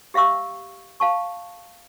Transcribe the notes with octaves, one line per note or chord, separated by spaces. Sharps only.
G4 E5 F5 C#6 E6
F5 A5 C#6